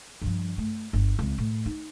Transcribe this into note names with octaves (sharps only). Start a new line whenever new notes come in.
G2 F3
A3
G1
C#2 C4
A2
D#4